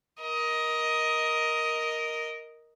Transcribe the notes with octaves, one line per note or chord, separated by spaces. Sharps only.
A#4 D#5